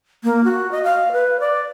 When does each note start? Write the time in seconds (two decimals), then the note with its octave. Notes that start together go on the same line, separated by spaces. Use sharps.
0.24 A#3
0.44 F#4
0.72 D#5
0.83 F5
1.12 B4
1.40 D5